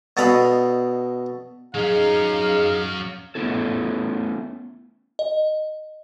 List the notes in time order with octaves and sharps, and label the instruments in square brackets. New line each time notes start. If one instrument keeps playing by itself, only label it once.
[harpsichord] B2 A4 D5 D#5 F5 B5
[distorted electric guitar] F#3 C#4 [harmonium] D#4 [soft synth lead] G#4 [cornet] F5
[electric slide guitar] A3 B3 C#4 E4 A4
[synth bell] D#5